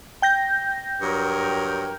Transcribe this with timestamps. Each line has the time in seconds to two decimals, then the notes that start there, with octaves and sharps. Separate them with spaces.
0.22 G5 G6 A#6
1.01 G2 F#3 A#4